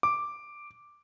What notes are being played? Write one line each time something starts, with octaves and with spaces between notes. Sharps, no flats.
D6